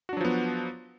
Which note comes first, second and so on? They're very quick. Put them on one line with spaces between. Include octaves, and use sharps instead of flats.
F#4 D4 F#3 F3 B3